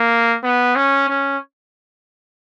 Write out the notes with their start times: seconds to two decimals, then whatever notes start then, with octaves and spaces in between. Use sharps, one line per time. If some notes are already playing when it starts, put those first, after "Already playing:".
Already playing: A#3
0.44 B3
0.76 C#4
1.09 C#4